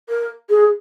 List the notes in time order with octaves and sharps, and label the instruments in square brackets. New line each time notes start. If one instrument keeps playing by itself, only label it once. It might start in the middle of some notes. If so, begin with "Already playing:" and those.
[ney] A#4
G#4